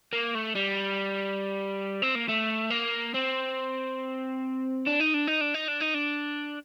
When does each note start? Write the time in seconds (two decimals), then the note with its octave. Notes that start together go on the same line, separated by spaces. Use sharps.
0.13 A#3
0.35 A3
0.56 G3
2.02 C4
2.15 A#3
2.28 A3
2.70 A#3
3.15 C4
4.86 D4
5.00 D#4
5.14 D4
5.27 D#4
5.41 D4
5.54 D#4
5.68 D4
5.81 D#4
5.95 D4